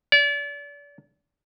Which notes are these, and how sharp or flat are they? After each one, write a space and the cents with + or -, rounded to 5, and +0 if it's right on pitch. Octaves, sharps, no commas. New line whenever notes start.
D5 -35